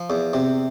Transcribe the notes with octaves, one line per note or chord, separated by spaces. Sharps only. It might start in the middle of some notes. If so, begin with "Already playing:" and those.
Already playing: F3
E2
C3